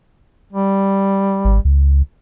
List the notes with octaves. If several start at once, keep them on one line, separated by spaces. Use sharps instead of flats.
G3
G#1
C#2